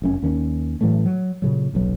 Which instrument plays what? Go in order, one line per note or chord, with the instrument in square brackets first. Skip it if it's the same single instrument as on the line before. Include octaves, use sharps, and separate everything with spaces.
[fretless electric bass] F1 F#2 C#4
D#2 D#3 C#4
A2 E3 F#3 A3
F#3
A#2 C#3 F#3
D#1 B1 F#3